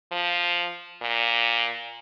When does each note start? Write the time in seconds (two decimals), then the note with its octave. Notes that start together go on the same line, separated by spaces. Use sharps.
0.12 F3
1.02 A#2